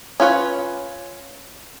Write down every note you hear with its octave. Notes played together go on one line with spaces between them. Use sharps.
C#4 F4 B4 C#5